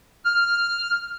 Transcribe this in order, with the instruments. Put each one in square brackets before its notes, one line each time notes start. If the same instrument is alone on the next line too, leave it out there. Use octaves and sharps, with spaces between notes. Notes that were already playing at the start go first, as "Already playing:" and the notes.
[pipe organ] F6